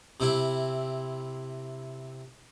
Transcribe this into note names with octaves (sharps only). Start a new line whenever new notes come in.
C3 C4 E4